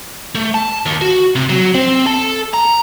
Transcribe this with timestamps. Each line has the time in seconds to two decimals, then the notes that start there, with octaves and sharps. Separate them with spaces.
0.35 A3
0.54 A5
0.86 D#2
1.01 F#4
1.36 C3
1.49 F#3
1.75 C4
2.06 A4
2.53 A#5